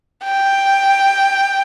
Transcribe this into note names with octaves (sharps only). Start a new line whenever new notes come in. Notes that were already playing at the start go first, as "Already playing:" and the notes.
G5